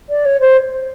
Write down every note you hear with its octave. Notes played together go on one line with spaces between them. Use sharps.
D5
C#5
C5